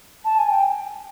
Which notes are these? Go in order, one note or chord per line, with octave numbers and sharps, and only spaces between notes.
A5
G#5
G5